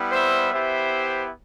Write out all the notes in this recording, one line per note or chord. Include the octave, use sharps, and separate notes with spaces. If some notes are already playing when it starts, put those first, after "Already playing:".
Already playing: G3 B3 E4
C5 E5
B3 E4 G4 C5 E5